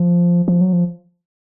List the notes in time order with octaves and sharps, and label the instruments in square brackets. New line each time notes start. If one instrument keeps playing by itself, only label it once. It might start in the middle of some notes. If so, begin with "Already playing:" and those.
Already playing: [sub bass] F3
F3
F#3
F3